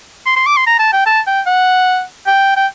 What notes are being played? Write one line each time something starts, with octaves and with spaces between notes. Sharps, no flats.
C6
C6
D6
C6
A#5
A5
G5
A5
G5
F#5
G5
G5